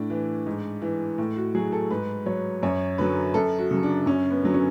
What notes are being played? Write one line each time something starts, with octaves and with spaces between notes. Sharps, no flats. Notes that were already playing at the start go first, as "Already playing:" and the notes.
Already playing: A2 D4
E3
G#2
E3
A2
F#4
F#3 G#4
A4
G#2 B4
F#3 C#5
F#2 C#5
D3 F#3 B4
F#2 A4
F#4
C#3 F#3
D4
F#2 C#4
B3
D3 F#3
C#4